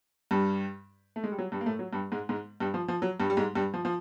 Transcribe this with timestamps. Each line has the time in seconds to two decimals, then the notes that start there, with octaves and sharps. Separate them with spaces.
0.31 G2 G3
1.16 A3
1.24 G#3
1.32 G3
1.38 F#3
1.52 G2 G3
1.61 A#3
1.66 A2 A3
1.79 F#3
1.93 G2 G3
2.12 G#2 G#3
2.29 G#2 G#3
2.60 G2 G3
2.74 F3
2.88 F3
3.02 F#3
3.20 G2 G3
3.30 G3
3.37 G#2 G#3
3.55 G2 G3
3.74 F3
3.85 F3